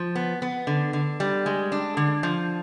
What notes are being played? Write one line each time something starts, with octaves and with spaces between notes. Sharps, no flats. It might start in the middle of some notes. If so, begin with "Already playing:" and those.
Already playing: F3
B3
B3
D3
D3
G3
G#3
D4
D3
F3